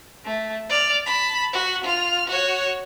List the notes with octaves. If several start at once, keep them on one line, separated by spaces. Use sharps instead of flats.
A3
D5 F6
A5 B5
F#4
F4 F6
F#4 C#5